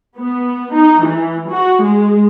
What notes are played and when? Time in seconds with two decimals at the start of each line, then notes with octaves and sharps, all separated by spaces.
0.17 B3
0.74 D#4
1.05 E3
1.50 F#4
1.83 G#3